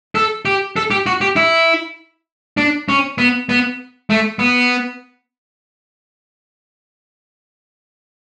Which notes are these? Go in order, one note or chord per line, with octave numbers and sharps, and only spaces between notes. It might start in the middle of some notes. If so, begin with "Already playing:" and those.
A4
G4
A4
G4
F#4
G4
E4
D4
C#4
B3
B3
A3
B3